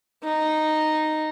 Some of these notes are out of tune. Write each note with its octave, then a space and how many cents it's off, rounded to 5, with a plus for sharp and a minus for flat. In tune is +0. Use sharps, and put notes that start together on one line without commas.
D#4 -5